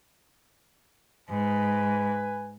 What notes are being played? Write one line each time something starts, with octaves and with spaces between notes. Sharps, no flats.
G#2 B4 G#5